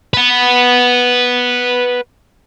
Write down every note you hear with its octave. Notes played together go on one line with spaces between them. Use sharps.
B4 F#5